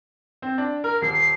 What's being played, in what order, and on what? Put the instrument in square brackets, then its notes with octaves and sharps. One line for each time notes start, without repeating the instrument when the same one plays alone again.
[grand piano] C4
D4
[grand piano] A#4 [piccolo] F6
[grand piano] D#1 [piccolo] C7